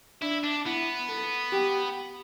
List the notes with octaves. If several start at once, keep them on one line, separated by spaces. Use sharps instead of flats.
D4 E4
D4
B3 E4
A4
G4